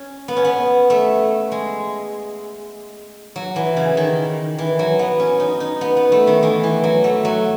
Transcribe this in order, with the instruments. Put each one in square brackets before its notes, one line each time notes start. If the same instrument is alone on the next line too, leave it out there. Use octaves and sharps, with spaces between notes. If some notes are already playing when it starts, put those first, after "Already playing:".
Already playing: [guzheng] C#4
B3
C#4
B3
A3
G#3
F#3
E3
C#3
D#3
E3
F#3
B3
C#4
D#4
D#4
B3
B3
A3
D#3
E3
E3
F#3
A3
F#3